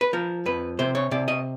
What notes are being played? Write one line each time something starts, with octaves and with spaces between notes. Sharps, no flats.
B4
F3 A#4
F2 B4
C3 C5
C#5
C3 D5
D#5